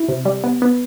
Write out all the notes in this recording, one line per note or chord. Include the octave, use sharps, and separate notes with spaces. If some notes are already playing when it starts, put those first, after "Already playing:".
Already playing: E4
C3
G3
B3
B3